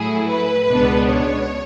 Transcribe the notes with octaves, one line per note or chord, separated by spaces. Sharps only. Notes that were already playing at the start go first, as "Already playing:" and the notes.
Already playing: A2 F#3 A3 E4 G#4
B4
C#2 B2 G#3 B3 D4
C#5